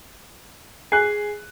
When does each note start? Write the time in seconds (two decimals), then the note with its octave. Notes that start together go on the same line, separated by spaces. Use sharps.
0.92 G#4 G#5 F#6 C7